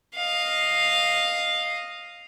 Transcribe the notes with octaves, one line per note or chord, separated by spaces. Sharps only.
D#5 F5